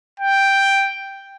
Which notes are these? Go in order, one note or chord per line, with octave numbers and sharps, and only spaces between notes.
G5